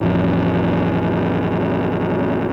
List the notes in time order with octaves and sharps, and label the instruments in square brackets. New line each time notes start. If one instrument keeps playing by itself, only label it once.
[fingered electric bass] A1 F2